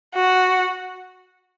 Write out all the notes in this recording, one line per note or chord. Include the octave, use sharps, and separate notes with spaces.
F#4